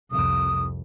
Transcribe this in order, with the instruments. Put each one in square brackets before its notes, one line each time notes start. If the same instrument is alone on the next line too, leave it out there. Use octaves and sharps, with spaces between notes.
[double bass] C2 F2 [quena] D#6